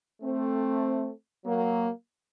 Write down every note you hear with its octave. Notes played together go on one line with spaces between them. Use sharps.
A3 C4
F#3 A#3